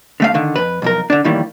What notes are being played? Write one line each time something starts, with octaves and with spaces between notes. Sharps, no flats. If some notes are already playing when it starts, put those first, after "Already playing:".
D3 A3 F5
D3 D#3
F2 B4
B1 F2 A#4
D3 D4
F2 A2 D#3 E3 G3 A#3